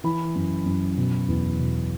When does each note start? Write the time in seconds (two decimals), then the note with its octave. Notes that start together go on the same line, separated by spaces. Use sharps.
0.04 E3 B5
0.35 F#2
0.66 F#2
0.97 B2
1.28 E2
1.59 B2